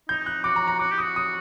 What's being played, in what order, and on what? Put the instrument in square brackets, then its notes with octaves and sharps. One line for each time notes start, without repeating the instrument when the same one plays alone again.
[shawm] D#4 [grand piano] G6
[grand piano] F#6
[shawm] F#4 [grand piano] D6
[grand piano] A#5
A#5
[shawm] F#4 [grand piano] D6
[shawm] G4
[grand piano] D#6
[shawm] F#4
[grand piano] D#6